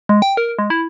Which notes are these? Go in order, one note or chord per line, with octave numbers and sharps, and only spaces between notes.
G#3
G5
A#4
G#3
E4